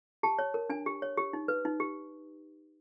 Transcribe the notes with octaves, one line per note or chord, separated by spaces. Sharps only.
G4 A5
C#5
A#4
D4 G#5
G4
C#5
G4
D#4
B4
D#4
G4